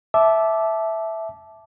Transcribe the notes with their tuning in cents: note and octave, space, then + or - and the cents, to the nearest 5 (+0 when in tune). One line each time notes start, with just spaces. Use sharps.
E5 -5 A5 -20 D6 +0